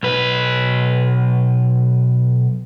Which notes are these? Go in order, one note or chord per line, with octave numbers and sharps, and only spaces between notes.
B1 B4